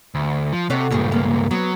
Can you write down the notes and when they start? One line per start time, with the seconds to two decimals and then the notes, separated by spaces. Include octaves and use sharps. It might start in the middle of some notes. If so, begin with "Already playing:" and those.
0.15 D2
0.53 F3
0.70 C3 F#4 A4 C#5
0.90 C#2 G2 A#2 G4 G#4
1.12 A#3
1.51 F#3 B3